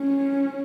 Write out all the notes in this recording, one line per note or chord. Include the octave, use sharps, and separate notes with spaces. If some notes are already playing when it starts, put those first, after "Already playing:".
Already playing: C#4